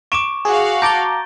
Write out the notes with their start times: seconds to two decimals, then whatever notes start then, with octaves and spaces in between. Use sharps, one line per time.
0.12 C#6 D6 D7 E7
0.45 F#4 G#4 F5
0.82 A5 A#5 D6 G6 A6 G7